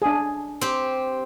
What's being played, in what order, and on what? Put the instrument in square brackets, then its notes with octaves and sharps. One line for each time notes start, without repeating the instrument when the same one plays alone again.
[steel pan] D4 G#4
[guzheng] C4 G4